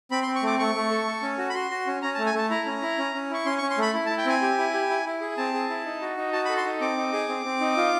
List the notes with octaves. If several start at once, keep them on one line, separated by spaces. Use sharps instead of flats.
C4 B5
C6
C4
C#6
A3 D6
A3 C#6
A3
A4
A4
C#4
F#4
B5
F#4 C6
F#4
C#4
C#4 A#5
A5
A3
G#5
A3 A5
E4 A#5
C#4
E4
C#4
C#4
E4 C#6
C#4 C6
C#6
C#4
C6
A3 B5
E4
A5
E4
G5
C4 G#5
G4
E4
G4
E4
E4
G#4
C4 A5
G#4
E4
D#4
F#4
D#4
F#4 A5
B5
A4
C6
D#4
C4 D6
D#4
G#4
C4
C4
D#4
F4